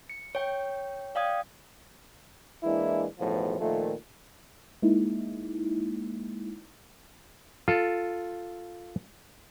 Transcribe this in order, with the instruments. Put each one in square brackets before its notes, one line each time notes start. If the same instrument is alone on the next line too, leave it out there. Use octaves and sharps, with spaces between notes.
[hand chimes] C#7
C#5 G5
D5 F5 G5 D#6 G#6
[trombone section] E3 G#3 A#3 D4 E4
B1 E2 A2 F3
A#2 D#3 F3 A3
[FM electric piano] G#3 A#3 D#4 E4
[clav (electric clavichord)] F4 A4